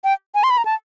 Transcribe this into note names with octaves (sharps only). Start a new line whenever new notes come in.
G5
G#5
C6
B5
A#5
A5